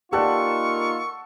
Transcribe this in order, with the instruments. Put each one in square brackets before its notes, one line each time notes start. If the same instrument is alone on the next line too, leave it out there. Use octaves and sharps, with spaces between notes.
[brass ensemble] A#3 D#4 F4 [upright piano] G4 D5 [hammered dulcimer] A4 F#5 [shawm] C#6